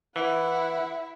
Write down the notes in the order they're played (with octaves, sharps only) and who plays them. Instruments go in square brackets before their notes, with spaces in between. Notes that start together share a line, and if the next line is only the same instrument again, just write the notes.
[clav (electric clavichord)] E3 [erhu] E4 [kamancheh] F#5